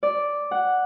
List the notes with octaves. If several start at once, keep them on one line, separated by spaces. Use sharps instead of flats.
D5
F#5